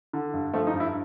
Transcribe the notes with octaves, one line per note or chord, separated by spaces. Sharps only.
D3
G2
F3 A3
D#4
G2
E4